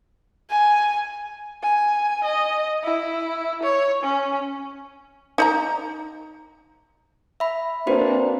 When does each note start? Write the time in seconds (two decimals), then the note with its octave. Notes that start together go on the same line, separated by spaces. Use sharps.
0.51 G#5
1.62 G#5
2.24 D#5
2.83 E4
3.63 C#5
4.03 C#4
5.38 D#4 D#5 A#5
7.40 E5 B5
7.87 A#3 C4 D4 F#4 B4 C5